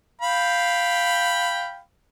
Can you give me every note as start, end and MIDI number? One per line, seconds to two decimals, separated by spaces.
0.22 1.80 77
0.22 1.80 79
0.22 1.80 83